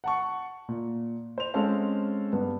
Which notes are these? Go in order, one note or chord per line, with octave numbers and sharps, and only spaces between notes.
F#5 A5 C#6
A#2
C5 F7
G#3 C4 C#4 A4 C5 F5
G2 B3